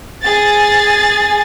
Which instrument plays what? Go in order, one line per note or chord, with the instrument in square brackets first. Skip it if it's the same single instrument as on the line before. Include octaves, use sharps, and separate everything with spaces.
[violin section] G#4 A6